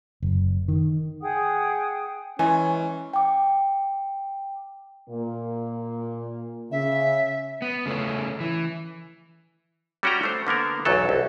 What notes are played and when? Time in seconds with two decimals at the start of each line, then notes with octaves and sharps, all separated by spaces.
0.23 F#1
0.68 D#3
1.22 G#4 F#5 G5 D#6
2.39 E3 G#3 C#4 G#5
3.14 G5 D6
5.10 A#2 A#3
6.72 C#3 E5
7.62 B3
7.86 C#3 A3 C4 C#4
8.40 E3
10.03 G3 C#4 F#4 G4 G5 A#5
10.23 A3 C5
10.47 D3 A#3 B3 A#4
10.85 B1 E2 F#3 A4
11.09 C2